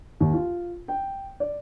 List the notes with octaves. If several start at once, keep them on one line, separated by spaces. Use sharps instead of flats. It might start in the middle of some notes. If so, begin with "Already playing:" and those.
D#2
F4
G5
D5